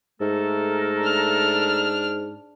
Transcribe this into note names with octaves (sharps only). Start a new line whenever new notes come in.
G#2 A3 A4 A#4
D4 F6